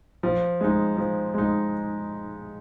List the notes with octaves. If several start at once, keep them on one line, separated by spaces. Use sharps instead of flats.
F3
G#3 D#4
F3
G#3 D#4